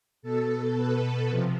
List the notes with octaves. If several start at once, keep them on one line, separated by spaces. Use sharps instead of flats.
B2 A4
B4
C3 F3